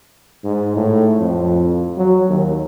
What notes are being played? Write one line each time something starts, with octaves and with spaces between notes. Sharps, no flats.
G#2
A2
F2
F#3
D#2